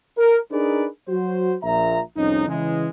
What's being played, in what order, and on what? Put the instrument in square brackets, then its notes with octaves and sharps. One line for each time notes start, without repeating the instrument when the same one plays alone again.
[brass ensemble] A#4
D4 D#4 G#4 A#4 B4 D5
F#3 F#4 C5
A#1 A#2 E5 A#5
C2 F2 C#4 D#4
C#3 E3 G#3